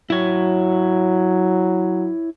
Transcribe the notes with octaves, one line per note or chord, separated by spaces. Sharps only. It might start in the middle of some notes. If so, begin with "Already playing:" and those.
F#3 E4 C#5